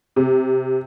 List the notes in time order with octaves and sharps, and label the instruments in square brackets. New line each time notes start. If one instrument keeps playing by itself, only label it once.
[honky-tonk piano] C3